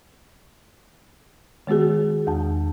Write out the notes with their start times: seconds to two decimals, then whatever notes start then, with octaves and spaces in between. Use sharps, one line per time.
1.67 D#3 G#3 B3 F#4 G#4
2.27 E2 A5